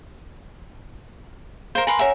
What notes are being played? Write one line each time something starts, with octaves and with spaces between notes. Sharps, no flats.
A#4 C5 F5
A#4 B4 G#5 C6
A#4 C#5 E5 F#5 G#5